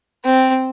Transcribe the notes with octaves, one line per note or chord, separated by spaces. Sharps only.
C4